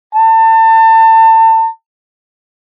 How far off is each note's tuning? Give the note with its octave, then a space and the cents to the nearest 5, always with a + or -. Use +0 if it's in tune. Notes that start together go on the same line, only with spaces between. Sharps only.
A5 +30